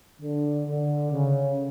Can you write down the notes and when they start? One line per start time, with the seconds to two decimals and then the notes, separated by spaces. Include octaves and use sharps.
0.21 D3
0.67 D3
1.12 C#3